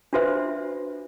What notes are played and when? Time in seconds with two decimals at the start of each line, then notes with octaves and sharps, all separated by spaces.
0.13 D4 F4 F#4 B4 C5 E5